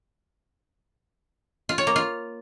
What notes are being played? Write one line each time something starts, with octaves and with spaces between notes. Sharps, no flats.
F4
C#5
A#3
F4